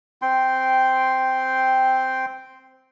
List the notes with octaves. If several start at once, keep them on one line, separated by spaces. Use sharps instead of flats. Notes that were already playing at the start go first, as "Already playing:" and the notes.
C4 G5 C6